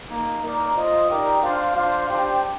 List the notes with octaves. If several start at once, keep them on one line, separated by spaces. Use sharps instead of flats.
A#3 D#4 A#4
A#3 D#4 A#4 D5
F4 C5 D#5
D#4 G4 A#4 D5 G5
D4 F4 C5 F5
D4 F4 C5 F5
D4 G4 C5 G5